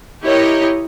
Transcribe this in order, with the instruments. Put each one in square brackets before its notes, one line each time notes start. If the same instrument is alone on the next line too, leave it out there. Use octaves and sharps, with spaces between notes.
[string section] E4 G4 A#4 C#5 D#5